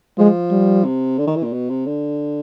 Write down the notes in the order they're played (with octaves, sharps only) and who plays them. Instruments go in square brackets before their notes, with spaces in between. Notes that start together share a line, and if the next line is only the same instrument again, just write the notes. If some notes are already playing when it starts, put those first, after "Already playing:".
[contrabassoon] F3 [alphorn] G#3
[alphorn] G3
[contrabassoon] C3
D3
D#3
E3
A#2
B2
C3
D3